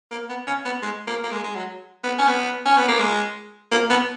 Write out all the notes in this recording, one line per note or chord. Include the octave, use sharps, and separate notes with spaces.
A#3
B3
C#4
B3
G#3
A#3
A#3
G#3
G#3
F#3
B3
C#4
B3
C#4
B3
A#3
G#3
A#3
B3